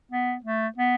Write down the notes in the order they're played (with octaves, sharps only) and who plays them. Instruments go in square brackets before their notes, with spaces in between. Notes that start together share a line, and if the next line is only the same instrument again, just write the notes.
[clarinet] B3
A3
B3